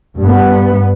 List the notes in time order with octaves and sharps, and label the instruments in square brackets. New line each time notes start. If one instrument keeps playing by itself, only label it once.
[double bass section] G2 B3